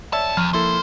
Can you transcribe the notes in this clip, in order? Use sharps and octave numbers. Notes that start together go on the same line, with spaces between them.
D#2 C#5 D5 E5 A5 E6
E2 F3 F6 D#7
A#3 E4 A4 C5